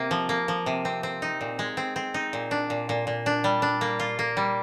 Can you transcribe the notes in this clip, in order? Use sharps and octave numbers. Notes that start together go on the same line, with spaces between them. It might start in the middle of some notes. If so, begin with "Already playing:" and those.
Already playing: C3 A#3
F3
A#3
F3
C3
C4
C4
D#4
A#2
G#3
C4
C4
D#4
A#2
D4
A#2
A#2
A#2
D4
G3
D4
A#3
F4
A#3
G3